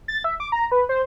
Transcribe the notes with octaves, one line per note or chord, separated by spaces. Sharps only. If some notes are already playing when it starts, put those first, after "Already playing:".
A6
E5
D6
A#5
B4
C5